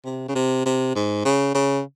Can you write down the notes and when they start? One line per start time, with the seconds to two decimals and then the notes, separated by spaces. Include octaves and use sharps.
0.05 C3
0.29 C#3
0.35 C3
0.66 C3
0.95 G#2
1.25 C#3
1.55 C#3